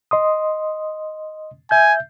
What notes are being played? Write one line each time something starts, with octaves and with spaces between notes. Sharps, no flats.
D#5 C6 D#6
E5 G#5 G6